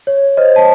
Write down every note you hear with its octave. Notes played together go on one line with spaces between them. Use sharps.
C#5
C5 D#5
A5